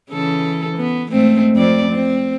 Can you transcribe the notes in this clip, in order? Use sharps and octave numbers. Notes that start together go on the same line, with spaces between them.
C#3 E3 A4
B3
G#2 A3 C4
F2 C4 D5
C4